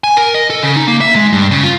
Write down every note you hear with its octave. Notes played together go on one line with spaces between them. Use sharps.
G#5
A#4
D#5
A4
C#3
D#4
A#3
E5
G#3
G2
C#3
F4